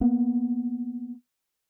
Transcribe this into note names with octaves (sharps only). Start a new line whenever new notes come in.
A#3 B3